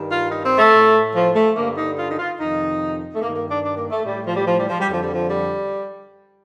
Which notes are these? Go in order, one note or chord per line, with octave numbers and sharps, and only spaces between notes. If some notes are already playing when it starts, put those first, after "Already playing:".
Already playing: G2 D#3
F4
D#4
C4
A3
A2
F3
A3
G2 D3 A#3
D#4
F4
D#4
F4
F2 C3 D#3 D#4
A3
G2 D#3 A#3
A#3
D4
D4
A#3
A3
A2 G3
F3
G3
F3
G3
F3
G3
F2 D3 F3
G3
F3
G3